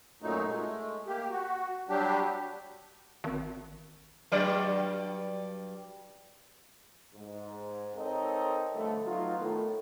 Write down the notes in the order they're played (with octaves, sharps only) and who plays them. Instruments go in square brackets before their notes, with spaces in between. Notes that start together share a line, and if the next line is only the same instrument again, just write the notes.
[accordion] F#2 A#2 F#3 A3 D#4
G#3 A3
A#3 G4
F#4
F#3 G3 D4 G4
[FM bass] G#1
[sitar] G2 F#3 D5
[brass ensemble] G#2
C4 D#4 A4 A#4 C#5 D#5
G2 D3 F3 A3
F#3 B3 D#4 F4
A2 D#3 A3